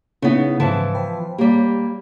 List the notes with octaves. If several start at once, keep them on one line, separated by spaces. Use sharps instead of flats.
C#3 B3 C#4 D#4 E4
G#2 C#3 E3 F3 A5
C5 G5 B5
G3 A#3 G4 C#5